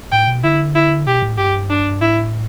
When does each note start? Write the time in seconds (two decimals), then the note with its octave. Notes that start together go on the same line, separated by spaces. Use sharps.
0.12 A2 G5
0.27 B2
0.44 D3 E4
0.75 E4
1.07 B2 G4
1.22 A2
1.38 G2 G4
1.70 D4
2.01 A2 E4